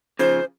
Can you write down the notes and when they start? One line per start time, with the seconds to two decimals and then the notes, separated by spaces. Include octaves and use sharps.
0.19 C#3 F3 C5